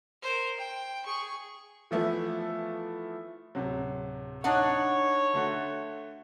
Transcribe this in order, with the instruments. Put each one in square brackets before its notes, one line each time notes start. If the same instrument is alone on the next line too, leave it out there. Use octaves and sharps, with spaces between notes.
[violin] A#4 C5
G5
G#4 C#6
[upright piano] E3 F3 A3 B3
[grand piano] D1 C3 F#3
[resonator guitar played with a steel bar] D4 D#4 F#5 [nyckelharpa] C#5
[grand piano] D3 A3 F#4